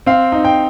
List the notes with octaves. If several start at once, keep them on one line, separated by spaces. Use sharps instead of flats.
C4 F5
D#4
G5